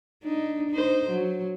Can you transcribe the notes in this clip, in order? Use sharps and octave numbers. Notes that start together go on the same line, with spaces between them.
D4 D#4
D#4 C5
F#3